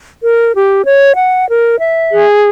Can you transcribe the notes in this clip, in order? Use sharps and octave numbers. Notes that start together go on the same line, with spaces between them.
A#4
G4
C#5
F#5
A#4
E5
G#4